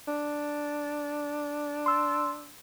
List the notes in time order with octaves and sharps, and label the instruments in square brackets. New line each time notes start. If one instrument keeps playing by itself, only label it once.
[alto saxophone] D4
[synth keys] C6 E6